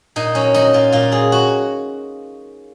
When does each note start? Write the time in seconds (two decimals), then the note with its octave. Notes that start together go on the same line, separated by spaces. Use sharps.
0.16 A#2 D#4
0.35 F#3 C#4
0.54 F#3 D#4
0.73 A#2 F4
0.92 A#2 F4
1.11 F#3 G#4
1.32 F#4